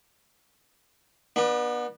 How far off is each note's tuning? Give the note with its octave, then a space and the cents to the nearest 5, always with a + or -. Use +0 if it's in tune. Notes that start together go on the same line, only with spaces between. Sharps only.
B3 -30 D4 +30